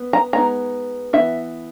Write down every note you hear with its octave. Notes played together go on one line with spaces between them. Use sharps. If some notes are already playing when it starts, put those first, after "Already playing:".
Already playing: B3
A#5
G#3 B3 D#4 A#5
E3 B3 D#4 E5